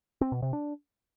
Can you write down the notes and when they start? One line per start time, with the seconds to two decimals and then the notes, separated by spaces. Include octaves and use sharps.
0.21 C4
0.32 B2
0.42 C3
0.53 D4